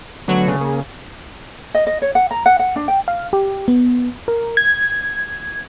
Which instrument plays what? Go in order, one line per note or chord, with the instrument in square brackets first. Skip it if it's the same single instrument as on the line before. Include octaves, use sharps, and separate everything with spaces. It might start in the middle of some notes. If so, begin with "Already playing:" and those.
[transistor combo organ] D3 A3 B3 [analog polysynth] F#3 F#4
[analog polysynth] C#3
[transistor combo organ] A#3 G#4
[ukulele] D#5
D#5
C#5
F#5
A#5
F#5
F#5
D4
G5
[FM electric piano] F5
G4
B3
A#4
G#6